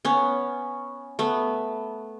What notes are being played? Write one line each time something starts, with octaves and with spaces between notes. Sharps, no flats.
B3 C#4
A3 B3